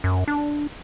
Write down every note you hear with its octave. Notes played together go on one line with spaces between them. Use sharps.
F#2
D4